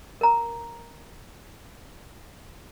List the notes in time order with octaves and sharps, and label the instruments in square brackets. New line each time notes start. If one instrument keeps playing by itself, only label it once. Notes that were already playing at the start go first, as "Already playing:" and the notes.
[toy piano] A#4 A#5